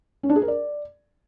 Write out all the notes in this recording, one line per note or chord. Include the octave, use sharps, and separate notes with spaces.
C#4
D4
G#4
A#4
D5